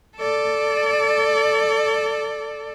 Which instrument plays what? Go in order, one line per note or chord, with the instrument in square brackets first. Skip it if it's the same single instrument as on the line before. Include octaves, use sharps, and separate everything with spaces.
[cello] A4 D5